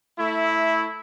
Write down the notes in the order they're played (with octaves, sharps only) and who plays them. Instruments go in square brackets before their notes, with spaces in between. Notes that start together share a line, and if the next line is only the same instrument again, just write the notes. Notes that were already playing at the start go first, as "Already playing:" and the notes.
[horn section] A3 E4